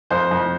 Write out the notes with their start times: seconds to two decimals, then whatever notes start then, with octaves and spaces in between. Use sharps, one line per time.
0.10 F2 C5
0.31 F2